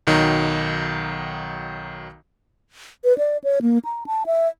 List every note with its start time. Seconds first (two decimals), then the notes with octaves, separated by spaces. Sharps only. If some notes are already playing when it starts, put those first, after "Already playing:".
0.07 B1 D#3 F#3 D#4
3.04 B4
3.18 D5
3.44 C#5
3.62 A#3
3.85 A#5
4.06 A5
4.26 E5